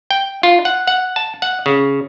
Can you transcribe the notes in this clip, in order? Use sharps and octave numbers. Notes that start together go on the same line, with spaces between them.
G5
F4
F#5
F#5
A5
F#5
C#3